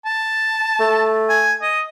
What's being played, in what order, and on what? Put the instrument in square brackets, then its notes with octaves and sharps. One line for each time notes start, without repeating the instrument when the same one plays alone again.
[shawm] A5
[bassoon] A3
[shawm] G#5
D#5